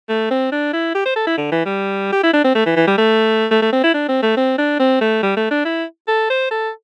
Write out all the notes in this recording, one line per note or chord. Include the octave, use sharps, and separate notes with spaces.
A3
C4
D4
E4
G4
C5
A4
E4
D3
E3
G3
G4
E4
D4
C4
A3
E3
E3
G3
A3
A3
A3
C4
E4
D4
C4
A3
C4
D4
C4
A3
G3
A3
D4
E4
A4
C5
A4